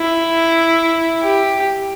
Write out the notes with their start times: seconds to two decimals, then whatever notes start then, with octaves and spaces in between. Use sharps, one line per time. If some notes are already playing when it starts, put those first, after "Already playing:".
Already playing: E4
1.23 G4